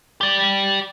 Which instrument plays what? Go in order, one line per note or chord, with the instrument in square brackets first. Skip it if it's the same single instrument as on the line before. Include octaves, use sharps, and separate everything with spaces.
[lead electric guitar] G4 D5